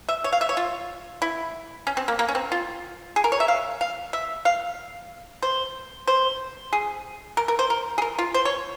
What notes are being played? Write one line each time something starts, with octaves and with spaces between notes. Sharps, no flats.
E5
C#5
F5
E5
C#5
F4
E4
C#4
C4
A#3
A#3
C#4
C4
F4
G#4
A#4
C#5
E5
F5
F5
E5
F5
C5
C5
G#4
A#4
A#4
C5
A#4
G#4
A#4
F4
C5
C#5